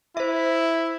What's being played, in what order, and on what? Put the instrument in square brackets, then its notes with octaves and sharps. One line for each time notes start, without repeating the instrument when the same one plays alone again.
[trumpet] E4 [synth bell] C5 E5